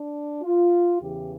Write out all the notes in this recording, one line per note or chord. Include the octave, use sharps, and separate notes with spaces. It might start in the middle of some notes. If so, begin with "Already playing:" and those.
Already playing: D4
F4
E2 C#3 E3 G4